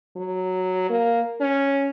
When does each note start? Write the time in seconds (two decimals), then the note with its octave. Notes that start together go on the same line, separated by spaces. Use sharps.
0.16 F#3
0.89 A#3
1.40 C#4